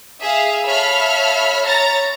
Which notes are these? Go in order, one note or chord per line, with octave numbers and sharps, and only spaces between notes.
G#4 E5 F5
A4 C#5 E5 F5 B5 F6
C#5 A#5 A6